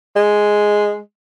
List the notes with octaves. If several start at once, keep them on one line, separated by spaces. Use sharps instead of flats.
G#3